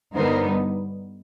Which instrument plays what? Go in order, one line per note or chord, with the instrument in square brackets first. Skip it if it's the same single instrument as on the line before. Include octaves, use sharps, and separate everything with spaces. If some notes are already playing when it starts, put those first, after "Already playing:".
[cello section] G2 D3 G3 B3 D#4 A#4 C5